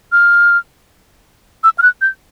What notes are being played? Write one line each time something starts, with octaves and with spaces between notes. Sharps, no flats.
F6
E6
F6
F#6
G6